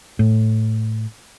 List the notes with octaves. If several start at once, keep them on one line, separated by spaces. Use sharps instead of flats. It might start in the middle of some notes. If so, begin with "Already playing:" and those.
A2